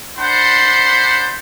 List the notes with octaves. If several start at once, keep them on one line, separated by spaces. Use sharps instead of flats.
D4 C5 F#5 A5 B5 C6